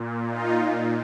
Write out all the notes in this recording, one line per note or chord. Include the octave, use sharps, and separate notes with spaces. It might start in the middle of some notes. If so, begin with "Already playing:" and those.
Already playing: A#2
D#4 F4